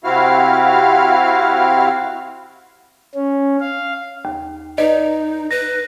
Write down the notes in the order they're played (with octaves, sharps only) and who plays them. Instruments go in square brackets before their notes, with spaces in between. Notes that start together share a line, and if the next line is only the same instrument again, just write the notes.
[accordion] C3 C4 E4 F#4 F5 F6
[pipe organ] C#4
F5
[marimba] D#2
[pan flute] D#4 [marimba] B4 D5 [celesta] D#5
[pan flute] B4 [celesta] A#6